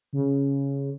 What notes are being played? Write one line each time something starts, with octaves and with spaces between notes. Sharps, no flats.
C#3